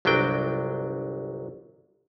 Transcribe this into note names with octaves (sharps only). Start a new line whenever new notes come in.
G1 C2 F#3 D4 G5